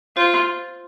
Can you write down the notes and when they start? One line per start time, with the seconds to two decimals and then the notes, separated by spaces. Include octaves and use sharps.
0.16 F4 C5